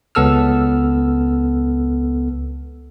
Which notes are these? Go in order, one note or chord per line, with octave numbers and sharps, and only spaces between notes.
C#2 B3 A4 E6 F6